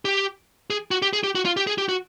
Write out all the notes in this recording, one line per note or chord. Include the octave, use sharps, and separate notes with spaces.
G4
G#4
F#4
G4
G#4
G4
F#4
F4
G4
G#4
G4
F#4